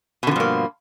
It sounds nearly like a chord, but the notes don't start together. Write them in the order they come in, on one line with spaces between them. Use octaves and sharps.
B2 D3 F3 G2 A#3